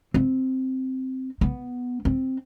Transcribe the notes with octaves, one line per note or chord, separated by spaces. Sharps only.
C4
B3
C4